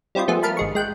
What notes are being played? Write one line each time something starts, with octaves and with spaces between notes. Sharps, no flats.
G3 C4 E4 F4 D#5
F3 A3 B3 G#4
A#4 F5 A5 B5
G#1 G#3 C#6
G#3 G5 F#6